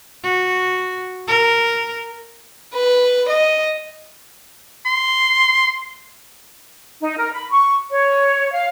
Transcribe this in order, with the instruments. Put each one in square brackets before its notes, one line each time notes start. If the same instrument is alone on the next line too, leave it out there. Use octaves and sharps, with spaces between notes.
[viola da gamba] F#4
A#4
[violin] B4
D#5
[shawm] C6
[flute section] D#4
A#4
B5
C#6
C#5
F5